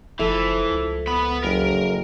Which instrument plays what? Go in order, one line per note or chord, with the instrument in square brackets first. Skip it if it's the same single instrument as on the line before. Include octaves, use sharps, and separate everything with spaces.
[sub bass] F#1 [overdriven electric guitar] E3 [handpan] F3 A4 E5
[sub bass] C#2
[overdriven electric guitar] B3 B5
[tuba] F#1 [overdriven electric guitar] A#4